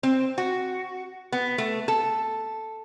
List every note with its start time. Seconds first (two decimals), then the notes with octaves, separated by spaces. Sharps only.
0.03 C4
0.38 F#4
1.32 B3
1.58 A3
1.88 A4